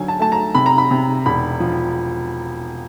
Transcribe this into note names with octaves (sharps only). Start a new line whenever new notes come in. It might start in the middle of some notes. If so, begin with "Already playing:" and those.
Already playing: D2 D3 F#3 G#5
A5
A3 A5
A#5
C3 B5
A#5
B5
C3
E1 B5
F3